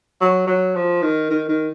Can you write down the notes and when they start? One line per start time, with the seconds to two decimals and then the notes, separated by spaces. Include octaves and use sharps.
0.21 F#3
0.47 F#3
0.75 F3
1.02 D#3
1.31 D#3
1.49 D#3